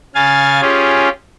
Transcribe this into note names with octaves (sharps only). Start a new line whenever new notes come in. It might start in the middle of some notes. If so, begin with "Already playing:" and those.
C#3 F5 G#5 A6
C#4 F4 G4 G#4